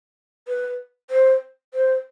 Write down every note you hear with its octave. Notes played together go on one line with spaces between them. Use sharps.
B4
C5
C5